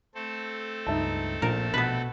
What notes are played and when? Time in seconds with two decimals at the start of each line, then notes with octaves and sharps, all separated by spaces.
0.15 A3 C4 A4
0.87 C#2 G2 D#4 E5 A5
1.42 A#1 A#2 A#4
1.74 B2 B3 B4